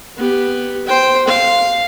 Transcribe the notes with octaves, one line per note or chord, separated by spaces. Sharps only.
B3 G4
C5 G5
F5